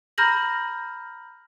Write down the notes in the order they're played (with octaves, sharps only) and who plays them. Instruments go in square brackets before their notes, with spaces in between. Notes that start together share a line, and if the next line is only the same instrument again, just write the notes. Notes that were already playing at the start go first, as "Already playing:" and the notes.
[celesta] A#5 B5 F6 G6 A#6 F#7